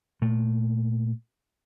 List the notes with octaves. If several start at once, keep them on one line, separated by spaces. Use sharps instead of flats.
A#2 A3